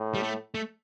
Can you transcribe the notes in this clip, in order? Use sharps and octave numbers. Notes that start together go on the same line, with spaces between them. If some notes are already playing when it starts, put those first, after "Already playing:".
Already playing: A2
G3
A3
A3